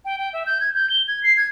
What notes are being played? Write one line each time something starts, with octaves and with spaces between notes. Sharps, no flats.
G5
G5
E5
G6
G#6
G6
G7
G#6
C7
G#6